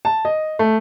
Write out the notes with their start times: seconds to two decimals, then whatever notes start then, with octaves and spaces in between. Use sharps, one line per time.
0.05 A5
0.25 D#5
0.59 A3